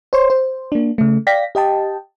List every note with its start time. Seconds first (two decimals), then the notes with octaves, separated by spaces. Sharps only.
0.13 C5 C#5 C6
0.30 C5
0.72 A#3 D4
0.98 C#3 A3
1.27 D5 F5 G5 A#6 B6
1.55 G4 D#5 G5 A5